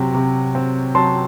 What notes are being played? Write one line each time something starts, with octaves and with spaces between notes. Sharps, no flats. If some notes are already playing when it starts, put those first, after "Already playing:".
Already playing: C3 F#3 C4
C3
C4
F#3 A5 C6